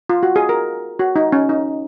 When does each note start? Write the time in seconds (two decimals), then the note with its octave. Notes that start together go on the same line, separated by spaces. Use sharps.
0.09 F4
0.23 F#4
0.36 G#4
0.49 A#4
0.99 F#4
1.16 D#4
1.32 C#4
1.49 D#4